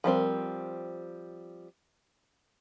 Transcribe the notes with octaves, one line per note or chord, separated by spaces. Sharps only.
F3 G3 C4 A#4